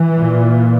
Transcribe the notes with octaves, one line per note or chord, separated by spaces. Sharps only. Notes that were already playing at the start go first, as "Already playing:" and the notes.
Already playing: E3
A#2